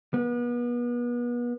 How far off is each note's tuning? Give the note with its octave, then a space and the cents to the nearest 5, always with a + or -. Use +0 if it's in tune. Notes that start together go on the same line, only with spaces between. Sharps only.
B3 -35